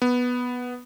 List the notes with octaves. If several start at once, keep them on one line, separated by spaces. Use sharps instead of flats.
B3